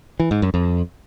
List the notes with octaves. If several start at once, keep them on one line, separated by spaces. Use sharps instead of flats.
E3
G#2
F#2
F2